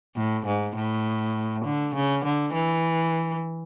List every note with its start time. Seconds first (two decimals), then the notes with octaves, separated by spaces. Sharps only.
0.16 A2
0.46 G#2
0.76 A2
1.65 D3
1.95 C#3
2.25 D3
2.54 E3